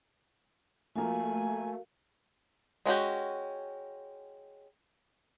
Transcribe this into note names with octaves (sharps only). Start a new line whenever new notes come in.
F3 A3 A#3 F#4 A#4 F5 G#5
G#3 C#4 F#4 G4